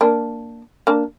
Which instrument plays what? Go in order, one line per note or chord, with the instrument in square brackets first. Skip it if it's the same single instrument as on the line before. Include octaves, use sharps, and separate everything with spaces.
[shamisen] A#3 D4
A#3 D4